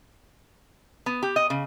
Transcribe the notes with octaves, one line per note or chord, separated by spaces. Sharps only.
B3
G4
D#5
C#3